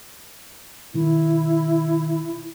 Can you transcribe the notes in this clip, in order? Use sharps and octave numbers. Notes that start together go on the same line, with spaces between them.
B2 D#3 E4